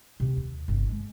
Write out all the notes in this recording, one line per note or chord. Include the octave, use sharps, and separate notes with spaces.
C3 A3
D#2
G1 C3
G#3